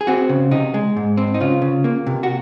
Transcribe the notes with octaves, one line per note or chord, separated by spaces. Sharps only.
G#4
C4 F#4
C#3
C3 D#4
G#3
G#2
C4
D#4
C#3 F4
C#3
A#3
C3
F#4